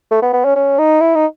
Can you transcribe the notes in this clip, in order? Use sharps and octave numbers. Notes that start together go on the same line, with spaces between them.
A3
B3
B3
C#4
C#4
D#4
E4
D#4